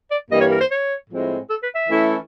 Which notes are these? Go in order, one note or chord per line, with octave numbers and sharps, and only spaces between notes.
D5
G2 E3 G3 A#3 D#5
C#5
A#4
C5
C#5
A2 F3 G#3 C4 E4
A4
B4
E5
E3 A3 C#4 E4 A4